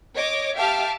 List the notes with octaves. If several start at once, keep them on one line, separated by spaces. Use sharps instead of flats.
C#5 D#5 D6
G4 E5 F5 A5 D6 F6